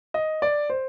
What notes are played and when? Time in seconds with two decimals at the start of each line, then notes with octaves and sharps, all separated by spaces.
0.14 D#5
0.42 D5
0.70 C5